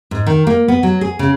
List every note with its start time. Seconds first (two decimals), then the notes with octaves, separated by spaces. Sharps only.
0.11 G#2
0.26 D#3
0.47 A#3
0.68 B3
0.83 F#3
1.01 G#4
1.19 C#3